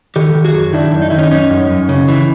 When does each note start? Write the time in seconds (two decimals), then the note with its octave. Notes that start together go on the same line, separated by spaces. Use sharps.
0.16 D#3 G4 A4
0.35 D#3
0.45 F#4 G#4
0.54 F#2
0.73 D#3 D4 E4
0.92 F#2
1.02 D#4
1.10 D#3 E4
1.18 C#4 D#4
1.31 F#2 C#4 D#4
1.51 F#2
1.69 F#2
1.89 C#3
2.08 E3